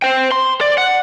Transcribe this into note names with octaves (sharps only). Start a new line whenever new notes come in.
C5 G5
C6
D5
F#5